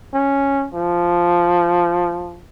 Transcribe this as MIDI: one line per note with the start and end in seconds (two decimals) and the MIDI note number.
0.14 0.68 61
0.74 2.42 53